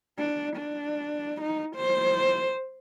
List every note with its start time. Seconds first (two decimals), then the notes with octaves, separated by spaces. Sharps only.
0.18 D4
0.56 D4
1.41 D#4
1.76 C5